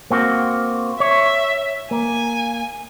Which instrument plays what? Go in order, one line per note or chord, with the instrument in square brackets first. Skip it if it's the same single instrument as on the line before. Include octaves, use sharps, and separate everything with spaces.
[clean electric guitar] A#3 C4 F#4
[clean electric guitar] C#5 [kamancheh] E5
[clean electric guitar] A#3 [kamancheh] G#5